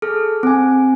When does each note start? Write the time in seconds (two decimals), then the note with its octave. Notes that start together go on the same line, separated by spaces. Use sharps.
0.02 G#4 A4 F6
0.43 C4 G#5